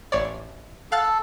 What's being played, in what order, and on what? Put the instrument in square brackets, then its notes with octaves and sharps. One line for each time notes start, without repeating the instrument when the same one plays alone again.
[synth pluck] A1 C#5 D5
[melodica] A4 [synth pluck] F5 F#6 A6